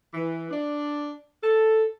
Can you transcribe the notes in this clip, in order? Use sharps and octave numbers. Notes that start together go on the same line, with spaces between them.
E3
D4
A4